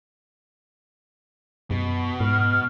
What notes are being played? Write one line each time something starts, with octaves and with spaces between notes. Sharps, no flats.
F#2 B2
G#2 F6